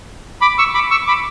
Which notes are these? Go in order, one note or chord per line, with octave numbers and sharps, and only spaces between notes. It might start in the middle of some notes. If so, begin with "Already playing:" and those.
B5 D6
C#6 E6
B5 D6
C#6 E6
B5 D6